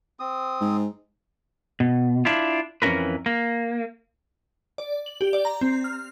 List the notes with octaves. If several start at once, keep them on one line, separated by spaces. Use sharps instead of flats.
C4 D#6
G#2
B2
D4 E4 F4
F2 E3 C#4 E4 A#4 B4
A#3
D5
F#7
G4
D5
A#5
C4
F6